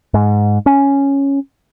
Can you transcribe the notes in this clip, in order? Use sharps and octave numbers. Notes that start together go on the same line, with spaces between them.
G#2
C#4